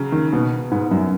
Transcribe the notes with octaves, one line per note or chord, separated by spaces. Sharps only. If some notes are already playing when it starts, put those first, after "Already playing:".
Already playing: C#3 F#3
D#3
B2 B3
G#2 B3
F#2